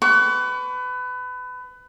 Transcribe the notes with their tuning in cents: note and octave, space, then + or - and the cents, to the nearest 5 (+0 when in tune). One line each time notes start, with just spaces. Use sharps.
B4 +25 C#6 +40